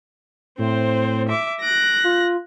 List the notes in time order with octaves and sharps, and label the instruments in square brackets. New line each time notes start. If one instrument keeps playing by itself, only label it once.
[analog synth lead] A2 [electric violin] C4 C5
[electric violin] E5 D6
[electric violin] F#6 A#6 [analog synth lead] D7
[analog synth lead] F4